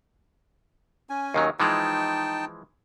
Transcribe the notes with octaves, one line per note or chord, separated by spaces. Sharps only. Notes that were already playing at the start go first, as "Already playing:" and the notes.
C#4 G#5
D#2 D#3 F#3
E3 F3 G#3 D#4 G5 A5